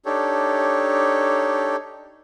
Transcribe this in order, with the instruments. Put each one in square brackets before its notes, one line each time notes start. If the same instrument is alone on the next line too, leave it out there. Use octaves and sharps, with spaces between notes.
[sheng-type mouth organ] D4 D#4 G4 A4 C#5